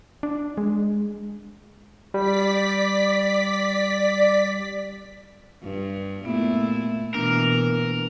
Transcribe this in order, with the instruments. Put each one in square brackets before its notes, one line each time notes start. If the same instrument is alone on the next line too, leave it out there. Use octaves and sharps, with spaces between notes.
[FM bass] D4
G#3
[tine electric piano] G3 [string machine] D5 B6
[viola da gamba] G2
[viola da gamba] A#2 A3 E4 [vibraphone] B3
[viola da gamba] B2 E3 A#3 [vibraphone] D4 [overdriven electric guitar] A#4